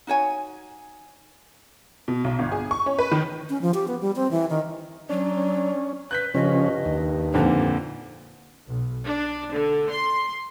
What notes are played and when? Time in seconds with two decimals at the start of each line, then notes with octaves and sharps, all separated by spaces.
0.07 D#4 F#4 C#5 G#5
2.08 B2
2.24 B1
2.39 G1
2.52 G#4
2.71 C#6
2.86 C#4
2.99 B4
3.12 D#3
3.50 C#4
3.62 F3
3.74 G4
3.88 B3
4.01 G3
4.16 C4
4.31 E3
4.50 D#3
5.10 F#3 C#4 D4
6.11 B4 F#6 G6 B6
6.35 G2 C#3 F3 C#4 D#5
6.85 D#2
7.34 F2 A#2 D3 D#4
8.67 B1
9.06 D4
9.54 D3
9.90 C6